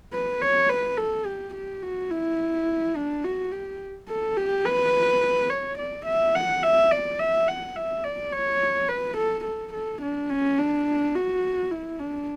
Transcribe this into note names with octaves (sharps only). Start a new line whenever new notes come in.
B4
C#5
B4
A4
G4
G4
F#4
E4
D4
F#4
G4
A4
G4
B4
C#5
D5
E5
F#5
E5
D5
E5
F#5
E5
D5
C#5
B4
A4
A4
A4
D4
C#4
D4
F#4
E4
D4